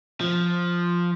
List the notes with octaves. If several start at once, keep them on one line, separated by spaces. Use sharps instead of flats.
F3